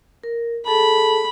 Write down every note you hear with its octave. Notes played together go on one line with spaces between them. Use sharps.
A#4
G#4 A4 A5 B5